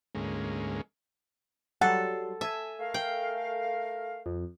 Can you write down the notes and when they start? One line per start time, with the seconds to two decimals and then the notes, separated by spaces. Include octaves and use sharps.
0.15 D2 G#2 G#3 A#3 C#4
1.81 F#3 G3 A4 F#5 C6
2.41 A4 E5 G#5
2.80 A3 A#4 F5
2.94 G5
4.26 F2